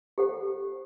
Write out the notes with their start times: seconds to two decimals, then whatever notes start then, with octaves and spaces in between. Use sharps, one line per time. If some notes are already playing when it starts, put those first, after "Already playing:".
0.18 G4 A4 C5 F#5